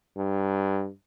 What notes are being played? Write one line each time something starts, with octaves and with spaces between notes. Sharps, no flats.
G2